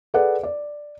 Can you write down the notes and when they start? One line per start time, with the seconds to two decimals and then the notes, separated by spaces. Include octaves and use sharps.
0.14 G#4 A4 B4 D5 F#5
0.43 D5